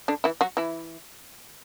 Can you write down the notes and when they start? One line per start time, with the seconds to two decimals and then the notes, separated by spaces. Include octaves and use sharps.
0.08 D3 D4
0.24 E3 E4
0.41 F#3 F#4
0.57 E3 E4